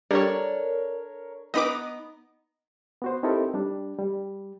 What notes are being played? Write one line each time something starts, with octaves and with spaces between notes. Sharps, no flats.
G3 D4 A4 A#4 C#5 D5
B3 D#4 B4 D#5 B5 D6
B3 F#4 C5
C4 D#4 E4 G4 A4 A#4
G3 D4
G3